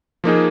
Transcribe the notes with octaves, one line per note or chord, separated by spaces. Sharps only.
F3 A#3 D#4 G#4